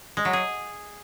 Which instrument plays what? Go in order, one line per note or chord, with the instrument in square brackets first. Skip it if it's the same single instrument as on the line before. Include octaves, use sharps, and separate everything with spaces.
[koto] G#3
F#3
G#4